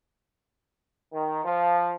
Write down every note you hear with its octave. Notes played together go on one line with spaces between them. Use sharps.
D#3
F3